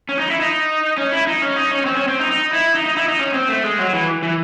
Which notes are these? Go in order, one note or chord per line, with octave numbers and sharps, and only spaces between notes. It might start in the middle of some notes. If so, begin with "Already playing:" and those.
C#4
D#4
E4
D#4
C#4
E4
D#4
C#4
D#4
C#4
C4
C#4
C4
D#4
D#4
E4
D#4
D#4
E4
D#4
C#4
C4
A3
G#3
F#3
E3
E3